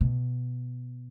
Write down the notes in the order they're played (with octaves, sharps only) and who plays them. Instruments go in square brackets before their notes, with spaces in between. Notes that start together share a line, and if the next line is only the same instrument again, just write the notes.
[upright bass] B2